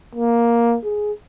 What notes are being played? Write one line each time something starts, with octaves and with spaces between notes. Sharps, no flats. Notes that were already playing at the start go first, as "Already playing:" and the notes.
A#3
G#4